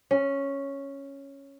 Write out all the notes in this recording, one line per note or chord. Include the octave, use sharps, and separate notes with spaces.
C#4